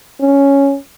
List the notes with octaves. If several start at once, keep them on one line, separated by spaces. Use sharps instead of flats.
C#4